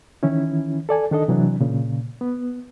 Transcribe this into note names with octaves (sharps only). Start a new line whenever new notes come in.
D#3 E3 C#4 E4
A4 D5 G#5
D#3 D4 A4 D#5
C3 E3 F#3 D4
A#2 C#3
B3